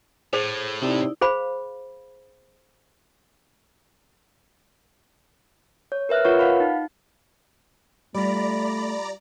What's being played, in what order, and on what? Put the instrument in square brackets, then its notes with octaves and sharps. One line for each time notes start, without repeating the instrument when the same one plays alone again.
[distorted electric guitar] A2 [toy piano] G#4 C5
[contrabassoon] C3 [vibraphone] D#4 E4 D5
[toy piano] G#4 C5 F5 B5
[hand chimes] C#5
A#4 B4 E5 F6 F#6
F4 A#4 B4 C#5 F#5 C#6
F5 F#5 B5
D#4
[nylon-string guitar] G3 F4 [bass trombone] A3 [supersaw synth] D5 A#5 [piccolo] B5